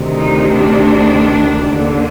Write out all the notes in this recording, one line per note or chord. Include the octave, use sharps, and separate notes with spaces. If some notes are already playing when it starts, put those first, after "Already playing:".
Already playing: D2 C3 D#3
D#4
D4
D#2 D3